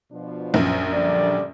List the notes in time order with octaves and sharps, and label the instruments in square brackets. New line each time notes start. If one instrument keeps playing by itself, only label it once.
[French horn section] B2 F3 D4
[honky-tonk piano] A#1 F#2
[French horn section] D3 G3 D5